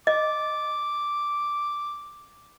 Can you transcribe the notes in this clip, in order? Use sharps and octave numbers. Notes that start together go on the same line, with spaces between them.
D#5 D6